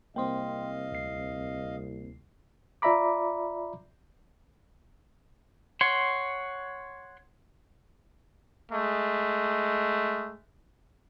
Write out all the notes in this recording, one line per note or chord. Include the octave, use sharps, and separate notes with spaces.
C2 A#3 C4 D#5 F5 G5 C6
D2 C7
F4 D5 E5 A#5 B5 D6
C#5 F#5 C6
G#3 A3